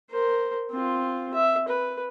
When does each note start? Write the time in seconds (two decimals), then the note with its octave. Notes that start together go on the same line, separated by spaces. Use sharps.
0.11 A#4 C5
0.71 C4 F4
1.34 E5
1.68 B4